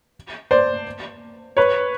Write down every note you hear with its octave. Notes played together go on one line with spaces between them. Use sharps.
C5 D5
B4 C#5